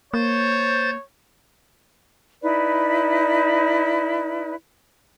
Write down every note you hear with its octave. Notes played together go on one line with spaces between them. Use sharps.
A#3 C5 C#5 G6 A6
D#4 E4 B4 D5